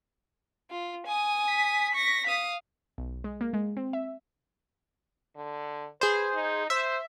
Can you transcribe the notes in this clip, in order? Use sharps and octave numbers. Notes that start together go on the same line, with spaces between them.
F4
G#5 D#6
B6
C#6 A#6
F5 D#6
B1
G#3
A#3
G#3
C4
E5
D3
G#4 B4 C5
D#4
C5 E5